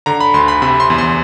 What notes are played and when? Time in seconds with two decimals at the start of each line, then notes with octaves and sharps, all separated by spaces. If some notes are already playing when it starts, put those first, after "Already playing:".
0.06 D3 A#5
0.20 B5
0.34 D2 C6
0.48 B5
0.62 C3 B5
0.80 C6
0.90 E2
0.98 C6